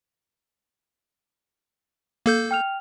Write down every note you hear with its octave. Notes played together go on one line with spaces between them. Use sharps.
A#3 A4 G6
G5 F6 F7